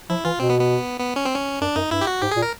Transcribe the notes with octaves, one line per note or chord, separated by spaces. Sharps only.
F3 E4
E3 F4
B2 C4
B3
B3
B3
C#4
C4
C#4
F#2 D4
F#2 D#4
G2 E4
G4
F#4
G#2 G4
G#4
A#2
A#4